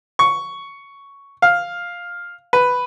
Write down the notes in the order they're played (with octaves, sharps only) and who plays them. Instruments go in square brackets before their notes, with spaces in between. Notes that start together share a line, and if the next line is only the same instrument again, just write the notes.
[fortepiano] C#6
F5
B4